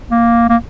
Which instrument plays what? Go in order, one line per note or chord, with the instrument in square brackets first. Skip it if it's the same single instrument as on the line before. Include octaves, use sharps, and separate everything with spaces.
[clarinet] A#3
A#3